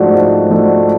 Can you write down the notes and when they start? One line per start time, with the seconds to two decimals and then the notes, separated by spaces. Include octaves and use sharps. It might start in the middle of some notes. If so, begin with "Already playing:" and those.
Already playing: G#2 F3 A3 D4 F#4
0.14 G#2
0.50 F3 A3 D4 F#4